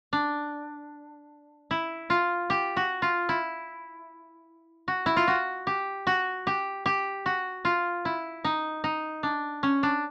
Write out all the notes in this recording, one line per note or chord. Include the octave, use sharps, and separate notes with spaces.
D4
E4
F4
G4
F#4
F4
E4
F#4
E4
F4
F#4
G4
F#4
G4
G4
F#4
F4
E4
D#4
D#4
D4
C#4
D4